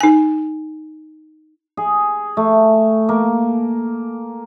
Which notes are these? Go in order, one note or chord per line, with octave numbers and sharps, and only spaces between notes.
D#4 G#5
G#4
A3
A#3